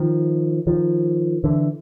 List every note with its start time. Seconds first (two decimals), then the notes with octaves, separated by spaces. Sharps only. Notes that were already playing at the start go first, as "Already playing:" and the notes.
Already playing: D#3 F3
0.67 D#3 F3
1.44 D3 E3